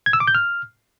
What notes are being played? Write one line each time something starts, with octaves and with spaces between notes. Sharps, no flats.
G#6
E6
D6
G6
F6